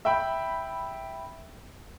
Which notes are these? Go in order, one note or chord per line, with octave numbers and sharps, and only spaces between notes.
E5 G5 B5